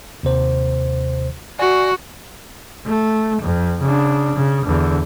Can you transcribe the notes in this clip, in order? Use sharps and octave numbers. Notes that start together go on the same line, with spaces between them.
D#2 C3 C5
F#4 D5 G#5 C#6
A3
F2
C#3 D4
C#3
E2 D3